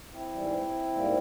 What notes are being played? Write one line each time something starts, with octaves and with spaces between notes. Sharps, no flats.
C4 E4
G#2 E3 G3
G#2 G3 A#3